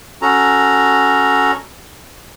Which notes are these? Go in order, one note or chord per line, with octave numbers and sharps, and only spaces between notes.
C#4 F#4 A4 A#5